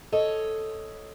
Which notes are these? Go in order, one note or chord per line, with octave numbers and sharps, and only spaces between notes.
A4 C#5 D#5